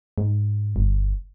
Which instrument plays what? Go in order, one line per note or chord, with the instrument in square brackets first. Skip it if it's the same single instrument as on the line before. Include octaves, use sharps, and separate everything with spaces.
[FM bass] G#2
G1